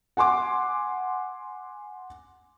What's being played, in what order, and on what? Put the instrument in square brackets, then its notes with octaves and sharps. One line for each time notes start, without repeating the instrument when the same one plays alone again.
[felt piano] F#5 G#5 C6 D6